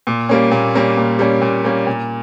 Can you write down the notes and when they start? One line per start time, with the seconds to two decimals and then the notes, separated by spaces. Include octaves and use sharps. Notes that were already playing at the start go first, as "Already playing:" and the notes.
0.07 A#2
0.29 G3 A#3 C#4
0.51 A#2
0.75 G3 A#3 C#4
0.97 A#2
1.19 G3 A#3 C#4
1.42 A#2
1.64 G3 A#3 C#4
1.87 A#2